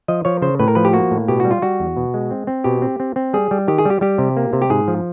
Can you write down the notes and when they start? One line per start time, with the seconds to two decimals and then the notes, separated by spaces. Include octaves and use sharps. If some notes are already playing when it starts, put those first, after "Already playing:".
0.08 F3 D#5
0.25 F3 C#5
0.42 C#3 C5
0.60 A2 B4
0.68 A#4
0.75 F3 B4
0.85 G4
0.93 A#3 F#4
1.11 A2
1.28 B2 G4
1.40 G3 F#4
1.51 F4
1.62 G3 F#4
1.80 E2
1.97 B2
2.14 G#3
2.31 C4
2.47 C4
2.64 B2 G4
2.82 C4
3.00 C4
3.16 C4
3.33 G3 G#4
3.51 G3
3.68 D#3 G4
3.78 G#4
3.85 G3 G4
4.01 G3 G4
4.18 C3
4.37 A#3
4.53 C3
4.62 G4
4.70 G#2 G#4
4.88 F3